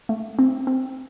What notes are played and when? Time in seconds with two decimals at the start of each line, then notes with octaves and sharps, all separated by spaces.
0.09 A3
0.39 C4
0.67 C4